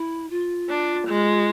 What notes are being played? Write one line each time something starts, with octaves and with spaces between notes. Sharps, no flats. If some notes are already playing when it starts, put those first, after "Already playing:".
Already playing: E4
F4
D4
G#3